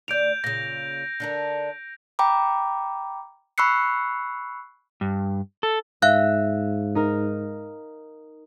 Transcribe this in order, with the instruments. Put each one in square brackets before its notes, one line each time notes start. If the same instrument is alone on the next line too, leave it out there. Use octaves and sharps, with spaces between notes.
[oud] D2 D5 [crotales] G6 D7 F7
[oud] A#2 C#3 [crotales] A#6
[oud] D3 D4 A#4
[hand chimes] G5 A#5 B5 D6
B5 C#6 E6 F#6 C7 C#7
[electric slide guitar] G2
A4
[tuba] G#2 [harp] E5 [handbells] F5 F#6
[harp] D#4 A#4